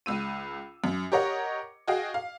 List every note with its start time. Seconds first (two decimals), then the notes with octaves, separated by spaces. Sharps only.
0.06 C#2 E6 D#7
0.84 F#2
1.12 G4 A#4 C#5 D#5 F#5
1.88 F#4 G#4 D#5 F5 G5
2.14 F5